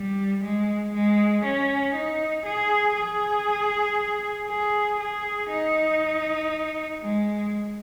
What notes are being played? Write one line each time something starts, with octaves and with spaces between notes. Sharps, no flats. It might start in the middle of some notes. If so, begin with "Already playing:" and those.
Already playing: G3
G#3
G#3
C#4
D#4
G#4
G#4
G#4
G#4
D#4
G#3